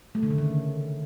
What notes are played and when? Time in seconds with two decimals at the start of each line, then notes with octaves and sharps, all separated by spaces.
0.15 A3
0.23 D3
0.31 C#3
0.38 D#3